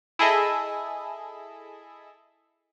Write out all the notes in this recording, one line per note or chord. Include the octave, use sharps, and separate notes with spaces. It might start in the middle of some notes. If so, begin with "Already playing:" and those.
E4 G#4 A4 D#5 E5